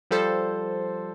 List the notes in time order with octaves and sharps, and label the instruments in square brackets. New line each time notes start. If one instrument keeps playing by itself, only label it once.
[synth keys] F3 G3 A4 C5